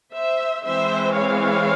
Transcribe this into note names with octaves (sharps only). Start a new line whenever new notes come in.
C5 E5
E3 G#3 C4 C5 E5
C#5 F5